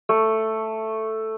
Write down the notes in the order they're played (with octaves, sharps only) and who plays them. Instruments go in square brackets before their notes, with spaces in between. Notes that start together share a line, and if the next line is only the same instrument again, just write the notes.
[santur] A3